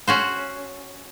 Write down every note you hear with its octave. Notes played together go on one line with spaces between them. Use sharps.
C#4 F#4 C5